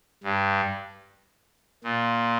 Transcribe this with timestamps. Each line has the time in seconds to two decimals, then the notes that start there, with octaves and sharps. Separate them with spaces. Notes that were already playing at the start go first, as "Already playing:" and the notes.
0.23 G2
1.84 A#2